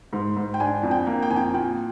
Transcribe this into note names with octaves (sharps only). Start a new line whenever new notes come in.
G#2
G#2
G5
D4 G#5
F2
G5
A#3
G5
F2 G#5
G5
A#2 G5